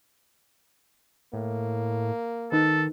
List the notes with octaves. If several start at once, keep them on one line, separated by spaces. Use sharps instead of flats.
A2 A#3
D#3 D#4 A4 B4